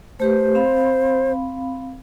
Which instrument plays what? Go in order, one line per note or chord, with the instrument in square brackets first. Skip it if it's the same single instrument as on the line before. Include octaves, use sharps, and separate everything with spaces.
[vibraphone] A3 G4 B4 [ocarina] C5
[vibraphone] C4 F5 B5